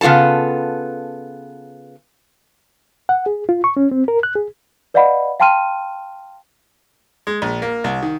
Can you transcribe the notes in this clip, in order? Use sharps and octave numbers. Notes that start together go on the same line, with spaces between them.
C#3 B3 F4 A4 A5
F#5
G#4
F4
C#6
C#4
C4
A#4
F#6
G#4
B4 D5 D#5 F5 F#5 B5
F5 G5 A5 C6 F6 D#7
G#3
A#1
A#3
C2
D#3